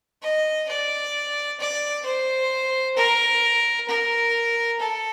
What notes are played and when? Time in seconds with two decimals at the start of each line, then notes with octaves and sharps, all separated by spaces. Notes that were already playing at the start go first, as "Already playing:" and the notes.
0.22 D#5
0.68 D5
1.59 D5
2.05 C5
2.96 A#4
3.88 A#4
4.79 A4